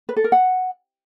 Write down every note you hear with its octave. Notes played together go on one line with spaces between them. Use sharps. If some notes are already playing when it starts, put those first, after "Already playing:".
B4
A4
A#4
F#5